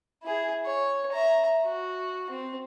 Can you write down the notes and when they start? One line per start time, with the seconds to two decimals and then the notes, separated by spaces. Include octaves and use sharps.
0.23 E4 G#4
0.66 C#5
1.12 E5 A#5
1.64 F#4
2.30 C4